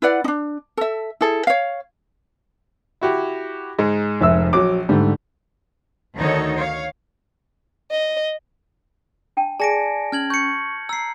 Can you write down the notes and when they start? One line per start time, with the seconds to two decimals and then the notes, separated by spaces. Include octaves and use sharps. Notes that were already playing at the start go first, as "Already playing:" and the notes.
0.02 E4 B4 D5 F#5
0.24 D4 D#4
0.77 A4 E5
1.21 E4 G#4 A4
1.47 C#5 F5
3.01 E4 F#4 G4
3.78 G#2 G#3 D#4
4.21 F1 E5 E6
4.53 A#1 F#3 D6
4.89 G#2 D3 G3 A3
6.16 D2 D#3 D#4 F#4 A4 C#5
6.56 C#5 F5
7.91 D#5
9.37 D4 G5 A5
9.60 G#4 D5 G#5 A5 A#6 C#7 D7
10.12 C#4 F6 G#6 F#7
10.30 C#6 G6 C#7
10.89 A#5 E6 C7